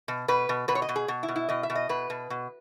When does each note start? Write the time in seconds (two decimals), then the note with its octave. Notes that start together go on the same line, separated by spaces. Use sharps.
0.08 B2
0.28 B2 B4
0.49 B2
0.68 B2 B4
0.75 C#5
0.82 D#5
0.89 B2
0.96 G#4
1.08 B2
1.23 E4
1.28 B2
1.36 E4
1.49 B2 D#5
1.63 E5
1.70 B2
1.75 D#5
1.89 B2 B4
2.10 B2
2.30 B2